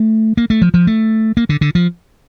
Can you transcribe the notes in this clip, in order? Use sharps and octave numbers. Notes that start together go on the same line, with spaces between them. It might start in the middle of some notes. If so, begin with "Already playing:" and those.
Already playing: A3
A#3
A3
F3
F3
A3
A#3
D3
D3
F3